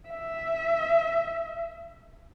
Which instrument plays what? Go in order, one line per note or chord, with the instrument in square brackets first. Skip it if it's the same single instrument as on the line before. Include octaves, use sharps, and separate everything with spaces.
[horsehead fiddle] E5